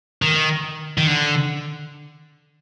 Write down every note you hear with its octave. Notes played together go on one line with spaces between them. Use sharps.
D#3
D#3
D3